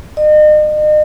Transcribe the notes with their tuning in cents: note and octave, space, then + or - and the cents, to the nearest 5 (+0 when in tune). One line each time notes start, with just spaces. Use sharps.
D#5 -40